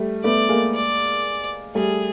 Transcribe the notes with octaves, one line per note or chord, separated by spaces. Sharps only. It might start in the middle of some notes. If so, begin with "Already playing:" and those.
Already playing: G3 A3
A3 B3 D5
G#3 A#3
D5
G3 A3 G#4